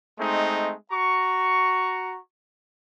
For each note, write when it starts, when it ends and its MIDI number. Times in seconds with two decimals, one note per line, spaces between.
0.20 0.74 56
0.20 0.74 57
0.20 0.74 60
0.20 0.74 63
0.91 2.17 66
0.91 2.17 82
0.91 2.17 85